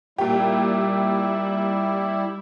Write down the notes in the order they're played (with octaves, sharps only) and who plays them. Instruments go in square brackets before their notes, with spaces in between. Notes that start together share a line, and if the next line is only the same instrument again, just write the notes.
[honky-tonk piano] A#2 G4 [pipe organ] G3 E4